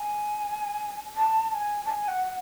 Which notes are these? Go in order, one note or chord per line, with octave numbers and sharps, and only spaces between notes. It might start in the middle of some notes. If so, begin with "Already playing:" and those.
Already playing: G#5
A5
A5
G#5
A5
G#5
F#5